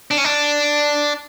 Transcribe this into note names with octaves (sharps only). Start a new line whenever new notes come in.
D4
C#4
D4